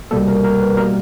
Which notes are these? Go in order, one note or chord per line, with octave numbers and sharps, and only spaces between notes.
C2 B2 G3 A#3 A4
A#4
A#4
B4
B2 G3 A#3 A#4